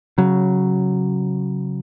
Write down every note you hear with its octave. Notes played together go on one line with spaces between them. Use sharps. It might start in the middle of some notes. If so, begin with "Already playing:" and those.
C#3 F#3